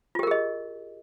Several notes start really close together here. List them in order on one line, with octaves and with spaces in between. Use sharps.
F4 G4 A#4 G#4 D#5